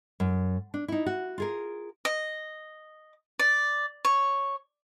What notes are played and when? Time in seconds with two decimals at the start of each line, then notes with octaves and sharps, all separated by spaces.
0.20 F#2
0.74 D4
0.88 D#4 E4
1.06 F#4
1.38 F4 G#4 A#4
2.05 D#5
3.39 D5
4.05 C#5